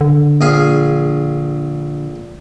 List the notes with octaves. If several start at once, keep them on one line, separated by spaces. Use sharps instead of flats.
D3
A#1 G#4 F5